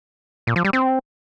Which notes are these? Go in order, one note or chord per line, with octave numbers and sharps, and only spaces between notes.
A#2
F3
G3
C4